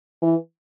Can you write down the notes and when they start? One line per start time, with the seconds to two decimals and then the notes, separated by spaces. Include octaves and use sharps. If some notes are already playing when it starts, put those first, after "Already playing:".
0.22 E3